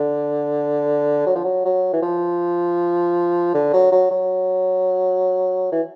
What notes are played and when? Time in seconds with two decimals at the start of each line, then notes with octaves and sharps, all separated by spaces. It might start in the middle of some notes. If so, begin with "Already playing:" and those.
Already playing: D3
1.26 F#3
1.35 F3
1.44 F#3
1.65 F#3
1.93 E3
2.02 F3
3.54 D3
3.73 F#3
3.92 F#3
4.11 F#3
5.72 E3